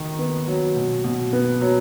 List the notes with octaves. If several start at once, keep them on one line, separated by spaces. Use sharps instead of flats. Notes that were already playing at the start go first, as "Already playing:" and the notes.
Already playing: D#3 D#4
B3
F#3
B2
B2
B3
F#3